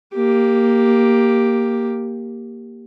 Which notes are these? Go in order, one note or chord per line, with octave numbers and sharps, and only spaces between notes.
A#3 G4